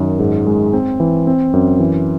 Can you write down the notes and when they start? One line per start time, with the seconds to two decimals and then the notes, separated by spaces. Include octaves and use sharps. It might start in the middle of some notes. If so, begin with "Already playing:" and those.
Already playing: F#2 D#3
0.19 G#2
0.47 G#3
0.73 C4
1.00 E3
1.27 C4
1.53 F#2
1.80 E3